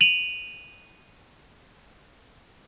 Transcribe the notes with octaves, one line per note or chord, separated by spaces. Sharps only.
D#7 F7 F#7